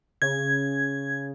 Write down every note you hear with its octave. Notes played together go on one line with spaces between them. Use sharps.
C#3 G#6